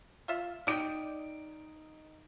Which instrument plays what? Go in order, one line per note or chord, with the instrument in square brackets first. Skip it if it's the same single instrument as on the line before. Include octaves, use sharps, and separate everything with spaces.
[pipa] F4 E5
[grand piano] D#4 D7 [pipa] D5 D#5 G5